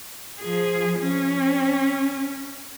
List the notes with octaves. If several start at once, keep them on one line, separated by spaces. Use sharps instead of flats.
F3 G#4
C#4